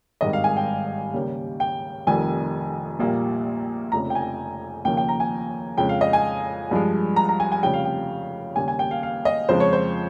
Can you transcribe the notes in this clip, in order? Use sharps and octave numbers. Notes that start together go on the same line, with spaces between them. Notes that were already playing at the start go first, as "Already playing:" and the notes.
G#1 G2 D#3 G#3 D#5
F5
G#5
G5
D#2 C#3 G3 A#3
G5
F1 F2 D#3 G3 G#5
A#1 A#2 G3 A#3
F1 F2 C#3 A#5
G5
G#5
D#2 C#3 F3 A#3 G5
G5
A#5
G#5
F2 C#3 G#3 G5
F5
D#5
G#5
G2 F3 G#3
A#5
A#5
G#5
G#5
F1 F2 C#3 G3 G5
F5
G5
D#2 C#3 G3 A#3 G#5
G#5
G5
F5
F5
D#5
F2 C#3 F3 G#3 C5
C#5
C5